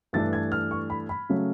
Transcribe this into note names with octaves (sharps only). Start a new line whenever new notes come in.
G2 E3 A3 D4 A6
G#6
F6
C#6
B5
B5
C#3 F#3 A3